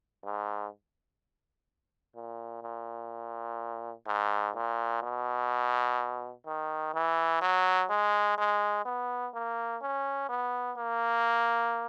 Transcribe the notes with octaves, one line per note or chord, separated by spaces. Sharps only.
G#2
A#2
A#2
G#2
A#2
B2
D#3
E3
F#3
G#3
G#3
B3
A#3
C#4
B3
A#3